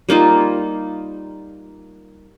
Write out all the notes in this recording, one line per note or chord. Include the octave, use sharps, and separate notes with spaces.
G3 A#3 D#4 F4